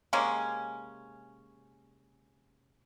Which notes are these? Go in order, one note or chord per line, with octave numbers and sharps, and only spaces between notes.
C3 G#3 A#3 C#4